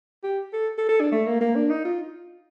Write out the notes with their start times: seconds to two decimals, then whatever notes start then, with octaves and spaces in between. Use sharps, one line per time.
0.23 G4
0.53 A4
0.78 A4
0.89 A4
1.01 D4
1.12 A3
1.27 A#3
1.41 A#3
1.55 D4
1.70 D#4
1.85 F4